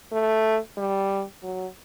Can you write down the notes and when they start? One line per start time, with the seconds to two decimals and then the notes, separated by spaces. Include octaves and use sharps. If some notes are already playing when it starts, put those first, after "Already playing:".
0.12 A3
0.77 G3
1.43 F#3